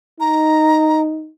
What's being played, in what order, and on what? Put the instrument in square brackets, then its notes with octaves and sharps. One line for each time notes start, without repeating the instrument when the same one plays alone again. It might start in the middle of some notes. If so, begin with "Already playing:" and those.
[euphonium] D#4 [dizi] A#5